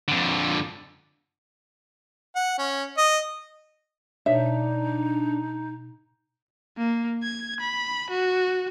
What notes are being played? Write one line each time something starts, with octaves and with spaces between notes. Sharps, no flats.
F2 D3
F#5
C#4
D#5
B2 D4 D#4 C#5 E5
A#3
G#6
B5
F#4